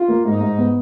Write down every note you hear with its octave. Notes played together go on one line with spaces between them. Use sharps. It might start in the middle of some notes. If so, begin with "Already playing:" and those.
Already playing: F4
A#3
G#2 D#4
G#2
B3